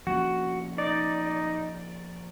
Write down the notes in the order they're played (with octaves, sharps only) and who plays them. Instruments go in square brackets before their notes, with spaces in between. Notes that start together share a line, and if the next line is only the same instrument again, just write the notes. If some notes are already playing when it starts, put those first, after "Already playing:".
[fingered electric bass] F3 A#3 C#4 [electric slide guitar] F#4
[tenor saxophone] D#4 [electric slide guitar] D5